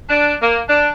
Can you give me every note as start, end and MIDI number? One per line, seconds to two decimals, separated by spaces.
0.09 0.36 62
0.42 0.60 58
0.69 0.92 62